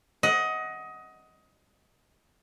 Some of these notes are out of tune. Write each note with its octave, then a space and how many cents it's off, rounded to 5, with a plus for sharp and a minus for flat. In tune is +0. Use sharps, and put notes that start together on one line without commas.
D#5 +20 F#5 +0